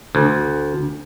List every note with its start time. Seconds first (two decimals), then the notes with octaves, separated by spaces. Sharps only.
0.15 D2